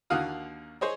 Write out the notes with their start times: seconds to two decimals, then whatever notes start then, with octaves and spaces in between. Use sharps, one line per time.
0.10 D#2 D3 A#3 F#4 F5 D#6
0.81 G#4 C5 C#5 D#5